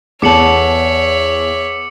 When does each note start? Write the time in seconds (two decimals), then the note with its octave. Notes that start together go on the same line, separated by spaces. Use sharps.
0.22 E2 B3 A4 C#5 E5 D6 C#7 F#7